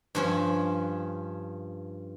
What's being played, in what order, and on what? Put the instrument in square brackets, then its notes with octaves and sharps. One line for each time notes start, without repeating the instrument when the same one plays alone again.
[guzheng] G2 F3 C#4